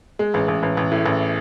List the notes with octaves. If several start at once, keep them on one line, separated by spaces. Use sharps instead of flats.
G#3
A1
A1
A1
A1
A2
A1